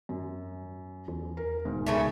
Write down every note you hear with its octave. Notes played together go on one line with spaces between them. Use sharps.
F#2
E2
A#4
D1 B1 G#2
C#2 A#2 C#3 A3